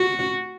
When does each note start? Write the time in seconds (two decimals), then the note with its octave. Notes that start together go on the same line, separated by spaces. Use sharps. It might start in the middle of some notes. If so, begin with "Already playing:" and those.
Already playing: F#4